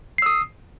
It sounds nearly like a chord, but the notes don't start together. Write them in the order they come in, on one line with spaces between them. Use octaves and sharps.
C7 E6 D#6